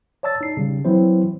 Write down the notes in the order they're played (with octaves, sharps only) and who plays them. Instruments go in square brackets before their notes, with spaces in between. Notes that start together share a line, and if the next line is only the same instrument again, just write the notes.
[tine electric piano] C#5 D5 A5 E6 A6
D#4 C7
C#3 G3
E3 F#3 C4 E4 C5